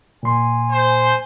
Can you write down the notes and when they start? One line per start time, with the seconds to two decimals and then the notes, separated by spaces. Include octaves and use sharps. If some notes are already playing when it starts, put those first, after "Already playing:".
0.23 A#2 G#5 C6
0.72 C5